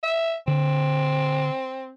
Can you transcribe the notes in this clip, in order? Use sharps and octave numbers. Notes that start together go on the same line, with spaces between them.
E5
D3 C4